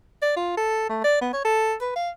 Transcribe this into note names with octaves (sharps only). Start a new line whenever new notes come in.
D5
F4
A4
A3
D5
B3
C#5
A4
B4
F5